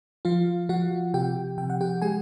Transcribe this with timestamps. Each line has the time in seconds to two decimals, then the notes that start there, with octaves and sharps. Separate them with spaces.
0.25 F3 F4 F5
0.69 F3 F#4 F#5
1.14 C3 G4 G5
1.58 C3 G5
1.70 F#5
1.81 G4 G5
2.02 G#3 G#4 G#5